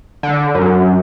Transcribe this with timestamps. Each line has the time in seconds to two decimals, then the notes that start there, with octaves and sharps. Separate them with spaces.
0.23 D3
0.55 F#2